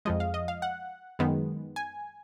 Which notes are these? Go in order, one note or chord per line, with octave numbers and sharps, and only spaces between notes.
F2 F3 G#3 D#5
F5
D#5
F5
F#5
F#2 D#3 G#3 B3
G#5